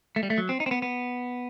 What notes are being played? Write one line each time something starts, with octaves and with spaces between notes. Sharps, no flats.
A3
G3
A3
F#3
C4
D#4
C4
B3
B3